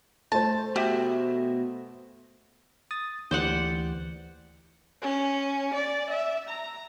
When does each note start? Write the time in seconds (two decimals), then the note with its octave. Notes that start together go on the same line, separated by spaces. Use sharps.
0.32 A3 C5 A5
0.76 B2 F#4 G4 E5
2.91 D#6 A6
3.31 D2 E3 G4 C5 D5 F#5
5.02 C#4
5.74 D5
6.10 E5
6.48 A#5